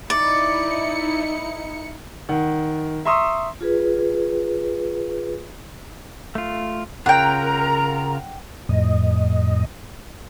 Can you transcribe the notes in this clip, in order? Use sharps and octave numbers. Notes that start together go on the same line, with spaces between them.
D#4 E4 D5 C#7
D#3 F#5
E5 A#5 C6 C#6 D#6 E6
F4 G#4 B4
A3 F4
C#3 F4 A#4 F#5 G5 A#5
F2 A2 D#5